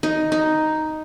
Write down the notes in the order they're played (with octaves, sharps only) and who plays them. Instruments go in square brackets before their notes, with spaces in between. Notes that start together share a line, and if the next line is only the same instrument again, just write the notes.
[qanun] D#4
D#4